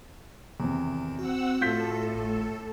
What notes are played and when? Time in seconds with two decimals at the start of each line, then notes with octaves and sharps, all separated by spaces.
0.60 E2 C3 D#3
1.19 C4 F#4 F#5 E6
1.61 A2 F4 A4 G6 B6
2.15 G#1